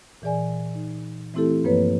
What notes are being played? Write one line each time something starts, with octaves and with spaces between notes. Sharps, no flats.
A#2 E3 G#4 D5 G#5
D#4
E3 A3 C4 E4 G4 A4
G2 F3 A#3 B4 C#5